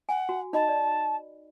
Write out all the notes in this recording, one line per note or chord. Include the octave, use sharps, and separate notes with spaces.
F#5 G#5
F#4
D#4 D#5 A5 B5
D5